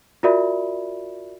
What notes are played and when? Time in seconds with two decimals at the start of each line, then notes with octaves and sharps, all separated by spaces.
0.23 F4 F#4 A#4 D5 E5 B5